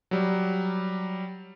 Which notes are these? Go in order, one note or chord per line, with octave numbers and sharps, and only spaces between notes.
F#3 G3